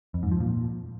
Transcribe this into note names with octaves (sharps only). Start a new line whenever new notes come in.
F2
G#2
F3
A#2